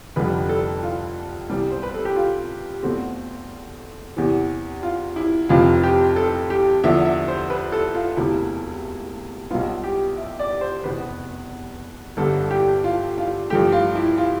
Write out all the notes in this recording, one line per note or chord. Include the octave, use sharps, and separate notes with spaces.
F1 F2 D3 G3 B4
A4
F4
C2 C3 E3 G3 B3
C5
B4
A4
G4
F4
E2 B2 A3 C4
E2 C3 E3
F4
E4
F1 F2 C3 F3 C4 F4
G4
A4
G4
E2 D3 F3 E5
E5
C5
B4
A4
F4
E1 D2 C3 E4
B1 B2 G3 B3 F4
G4
E5
D5
C5
F1 E2 B2 B3 B4
G1 G2 D3 A4
G4
F4
F4
G2 F3 A3 G4
F4
E4
F4